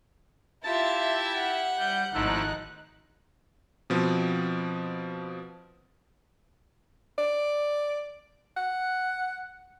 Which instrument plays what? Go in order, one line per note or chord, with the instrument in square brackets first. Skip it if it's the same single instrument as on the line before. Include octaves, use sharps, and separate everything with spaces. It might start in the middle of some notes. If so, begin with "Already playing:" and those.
[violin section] E4 G4 E5 [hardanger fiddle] F4 [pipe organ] A5 A6
[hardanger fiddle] F#5
[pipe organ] G3 [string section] G6
[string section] G#1 D#4 F#6 [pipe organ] F3 A3 E4
[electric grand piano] B2 F3 B3 C4
[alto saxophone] D5
F#5